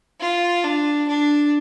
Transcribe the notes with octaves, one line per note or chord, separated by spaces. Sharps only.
F4
D4
D4